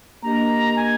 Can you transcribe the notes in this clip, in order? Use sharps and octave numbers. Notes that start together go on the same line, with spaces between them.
A#3 D4 G4 A#4 D#5 A#5
G#5